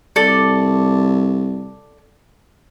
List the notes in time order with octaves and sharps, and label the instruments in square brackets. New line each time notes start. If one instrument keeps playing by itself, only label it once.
[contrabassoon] C2 [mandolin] A4 D5